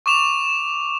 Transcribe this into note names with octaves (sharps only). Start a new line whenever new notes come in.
C#6 D6 E7 F7